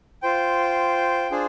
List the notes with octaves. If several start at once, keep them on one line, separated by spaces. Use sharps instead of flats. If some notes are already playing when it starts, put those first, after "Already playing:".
F4 C5 G5
D4 F4 G#4 C5